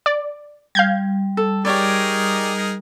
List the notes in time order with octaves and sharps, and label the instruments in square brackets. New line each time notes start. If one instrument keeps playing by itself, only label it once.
[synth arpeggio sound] D5
[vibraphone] G3 [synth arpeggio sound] F5 G6 G#6
[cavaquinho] A4
[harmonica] D#4 G#4 A#4 [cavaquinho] G4 C#5 D5